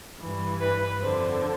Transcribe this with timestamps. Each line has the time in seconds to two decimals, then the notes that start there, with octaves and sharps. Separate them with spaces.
0.20 G2 E3
0.60 B4
1.00 F2 D3 C5